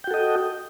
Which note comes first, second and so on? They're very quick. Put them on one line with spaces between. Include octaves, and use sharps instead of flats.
G5 F#4 A4 D#5